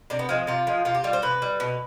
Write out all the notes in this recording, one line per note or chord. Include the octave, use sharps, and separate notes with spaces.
C3 D4
B3
F3 G#3 C4
C3 F4
F3 G#3
C3 F4
G4
G3 F4
C5
C3 B4
G3
B2